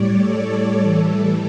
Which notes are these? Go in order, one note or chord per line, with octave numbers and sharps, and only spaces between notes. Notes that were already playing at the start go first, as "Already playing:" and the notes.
Already playing: A2 G3 C#5 D5
A4
A2 E3 G3